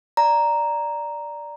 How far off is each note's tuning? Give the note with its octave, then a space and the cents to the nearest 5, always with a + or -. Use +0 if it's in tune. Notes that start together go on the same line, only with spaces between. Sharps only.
D5 +0 A#5 +0